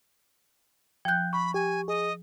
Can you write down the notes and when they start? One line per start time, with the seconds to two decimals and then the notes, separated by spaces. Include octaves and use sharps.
1.05 F3 G5 F#6 G6
1.33 B5 C#6
1.54 G4 G#5
1.88 G#4 D#5